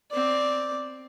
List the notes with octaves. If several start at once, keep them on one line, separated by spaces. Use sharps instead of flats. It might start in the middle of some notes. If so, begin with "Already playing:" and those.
C4 D5